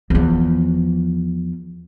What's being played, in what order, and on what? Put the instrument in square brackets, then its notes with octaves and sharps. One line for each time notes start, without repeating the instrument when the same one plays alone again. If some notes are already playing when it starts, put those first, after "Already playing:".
[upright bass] E2 F3